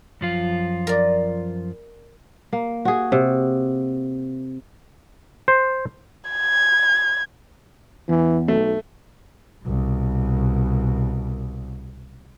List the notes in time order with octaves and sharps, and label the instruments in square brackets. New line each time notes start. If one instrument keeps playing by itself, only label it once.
[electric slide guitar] F#2 F3 F4
[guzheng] A#4 D5
[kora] A#3
F#4 G#4
C3
[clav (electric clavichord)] C5
[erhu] G#6
[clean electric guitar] E2 [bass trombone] E3
[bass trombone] B1 [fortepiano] A3
[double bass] C2 B2